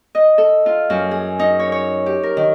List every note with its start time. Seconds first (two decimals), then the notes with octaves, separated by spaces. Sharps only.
0.15 D#5
0.38 A4
0.66 F4
0.90 F#2
1.11 G#4
1.39 D#4
1.59 C#5
1.72 C#5
2.06 G4
2.23 A#4
2.37 D#3